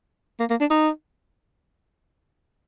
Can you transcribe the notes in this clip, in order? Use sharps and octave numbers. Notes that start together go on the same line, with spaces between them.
A#3
A#3
D4
D#4